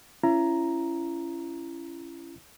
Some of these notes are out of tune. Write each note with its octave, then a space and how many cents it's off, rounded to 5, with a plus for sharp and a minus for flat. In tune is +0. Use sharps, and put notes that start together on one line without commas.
C#4 +0 E4 +35 A#5 +0